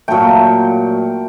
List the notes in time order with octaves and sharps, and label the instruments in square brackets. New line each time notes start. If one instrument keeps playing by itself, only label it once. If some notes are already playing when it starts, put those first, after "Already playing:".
[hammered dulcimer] A#2 F#3 A3 G5